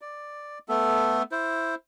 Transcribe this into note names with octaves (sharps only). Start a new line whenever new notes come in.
D5
A3 B3 A4
E4 C5